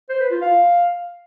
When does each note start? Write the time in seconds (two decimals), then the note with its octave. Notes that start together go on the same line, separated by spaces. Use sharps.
0.09 C5
0.20 B4
0.31 F4
0.42 F5